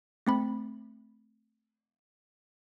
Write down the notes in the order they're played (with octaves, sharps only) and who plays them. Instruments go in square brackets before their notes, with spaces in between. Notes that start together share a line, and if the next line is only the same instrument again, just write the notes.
[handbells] A3 C4 B5